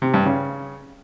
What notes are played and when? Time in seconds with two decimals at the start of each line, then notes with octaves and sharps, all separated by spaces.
0.02 C3
0.14 G2
0.26 C#3